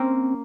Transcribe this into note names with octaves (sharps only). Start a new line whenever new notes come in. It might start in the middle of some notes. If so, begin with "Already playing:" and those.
Already playing: A#3 C4 C#4